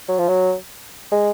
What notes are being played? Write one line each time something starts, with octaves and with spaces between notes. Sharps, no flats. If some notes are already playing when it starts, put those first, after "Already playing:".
F#3
F3
F#3
G#3